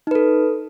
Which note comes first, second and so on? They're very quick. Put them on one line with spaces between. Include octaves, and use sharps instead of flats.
D#4 B4 A4